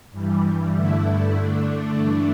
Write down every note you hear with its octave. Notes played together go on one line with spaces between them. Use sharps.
G2 E3 G3
G2 D3 A3 E4
D3 A3 D4
G2 E3 A3 D4